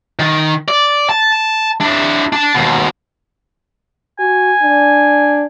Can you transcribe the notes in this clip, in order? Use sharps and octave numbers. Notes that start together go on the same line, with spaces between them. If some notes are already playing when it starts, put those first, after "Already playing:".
D#3
D5
A5
D4 E4
D4 A5
D#2 B2
F#4 G#5
D4